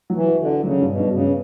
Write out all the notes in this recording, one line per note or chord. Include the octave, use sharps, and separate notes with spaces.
F#3
E3
F#4
D3
D4
C#3 F#3
G2
B2
G2
C#3
B3